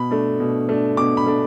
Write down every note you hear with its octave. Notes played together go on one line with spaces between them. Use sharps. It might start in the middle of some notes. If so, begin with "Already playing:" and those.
Already playing: B2 B5
A3 D4
B2
A3 D4
B2 D6
B5
A3 D4